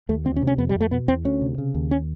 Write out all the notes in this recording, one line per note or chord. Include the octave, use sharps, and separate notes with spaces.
D#2 A3
D2 C4
C#4
C3
C#4
F2 B3
G3
F2
A3
B2 B3
E2 C4
D2 C#4
C3
C#3
D#2
C#4